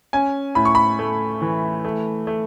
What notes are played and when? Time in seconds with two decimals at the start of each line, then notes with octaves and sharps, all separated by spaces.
0.13 C#4 G#5
0.55 A2 B5
0.65 C#6
0.75 B5
0.99 A3
1.42 E3
1.84 A3
2.27 A3